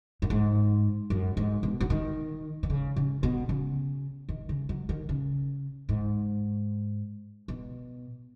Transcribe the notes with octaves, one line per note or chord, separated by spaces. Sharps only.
F#2
G#2
F#2
G#2
B2
F#3
D#3
D#3
C#3
C#3
B2
C#3
D#3
C#3
F#3
D#3
C#3
G#2
B2